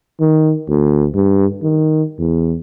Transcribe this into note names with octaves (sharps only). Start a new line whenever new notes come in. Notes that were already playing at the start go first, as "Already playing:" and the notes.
D#3
D2
G2
D#3
E2